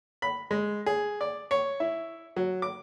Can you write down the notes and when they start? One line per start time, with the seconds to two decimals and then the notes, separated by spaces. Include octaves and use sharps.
0.22 B5
0.51 G#3
0.86 G#4
1.21 D5
1.51 C#5
1.80 E4
2.37 F#3
2.62 D6